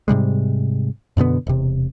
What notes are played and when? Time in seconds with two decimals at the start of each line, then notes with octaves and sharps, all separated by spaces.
0.08 G#2 C3 G3 G#3
1.17 F#2 B2 D3 B3
1.47 E1 C3